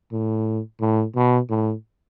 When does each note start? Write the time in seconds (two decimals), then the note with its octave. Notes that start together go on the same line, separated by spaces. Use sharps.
0.12 A2
0.81 A2
1.16 B2
1.50 A2